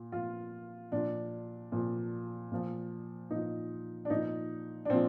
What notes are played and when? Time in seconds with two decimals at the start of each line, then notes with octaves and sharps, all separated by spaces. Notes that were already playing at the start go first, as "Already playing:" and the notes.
Already playing: A#2
0.12 A#2 F3 F4
0.92 A#2 F3 D4
1.72 A#2 F3
2.52 A#2 F3
3.31 A#2 F3 D#4
4.05 D4
4.10 A#2 F3 D#4
4.85 D4
4.89 A#2 F3 C4